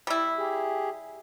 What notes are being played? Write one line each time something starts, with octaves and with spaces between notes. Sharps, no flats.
G3 E4
G4 G#4